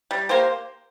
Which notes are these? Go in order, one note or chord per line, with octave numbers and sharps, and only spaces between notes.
G3
A#3 G4 C5